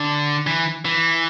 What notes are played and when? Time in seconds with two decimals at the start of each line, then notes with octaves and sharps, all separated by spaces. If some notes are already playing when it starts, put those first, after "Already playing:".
Already playing: D3
0.47 E3
0.85 E3